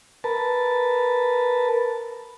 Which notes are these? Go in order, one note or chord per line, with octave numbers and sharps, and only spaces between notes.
A#4 B4 A5